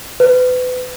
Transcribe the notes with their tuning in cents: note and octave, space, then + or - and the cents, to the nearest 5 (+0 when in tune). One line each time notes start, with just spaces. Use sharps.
B4 +30